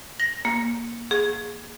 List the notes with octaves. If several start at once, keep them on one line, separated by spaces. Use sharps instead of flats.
A#6
A#3
G#4